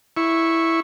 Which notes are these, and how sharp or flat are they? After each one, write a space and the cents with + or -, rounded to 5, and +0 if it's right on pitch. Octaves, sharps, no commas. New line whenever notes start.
E4 +0 C#6 -10